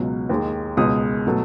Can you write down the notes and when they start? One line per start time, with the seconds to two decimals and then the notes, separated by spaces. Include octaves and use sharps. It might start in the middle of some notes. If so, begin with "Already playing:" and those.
Already playing: C#2 B2 F#3
0.29 D#2 D#3 G#3
0.77 C#2 B2 G#3 D#6
1.27 B2 F#3 A3